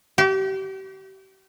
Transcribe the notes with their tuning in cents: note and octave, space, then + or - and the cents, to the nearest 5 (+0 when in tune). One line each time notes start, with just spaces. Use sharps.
G4 -35